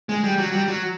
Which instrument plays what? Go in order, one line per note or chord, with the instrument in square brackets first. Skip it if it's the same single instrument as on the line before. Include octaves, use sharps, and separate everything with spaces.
[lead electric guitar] G#3
G3
F#3
G3
F#3